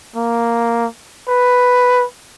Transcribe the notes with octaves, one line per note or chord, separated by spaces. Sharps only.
A#3
B4